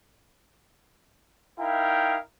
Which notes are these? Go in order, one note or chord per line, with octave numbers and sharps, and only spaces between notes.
D#4 E4 A#4 F5 G5